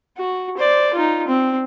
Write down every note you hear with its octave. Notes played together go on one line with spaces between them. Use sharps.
F#4
C5 D5
D#4 F4
C4